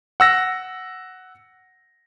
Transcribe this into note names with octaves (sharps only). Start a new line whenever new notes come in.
F#5 E6 A#6